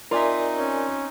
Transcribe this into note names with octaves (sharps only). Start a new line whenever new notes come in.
C4 D#4 F4 A#4 D5 E5 G#5
C#4